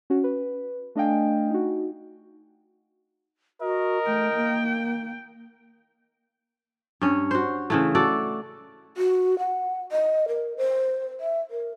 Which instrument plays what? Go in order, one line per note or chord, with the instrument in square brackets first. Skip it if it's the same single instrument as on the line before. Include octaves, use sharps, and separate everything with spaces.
[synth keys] C#4 F#4
B4
A3 D4 D#5 F5 G5 G#5
D#4 F#4
[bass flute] F#4 [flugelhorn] A#4 [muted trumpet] D#5
[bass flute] A3 [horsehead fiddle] G5
[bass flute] A#3
[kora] G2 C#4
F#4 C5
C#3 E3 A3
F#4 A4 D5
[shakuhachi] F#4
F#5
D#5
A#4
C5
E5
A#4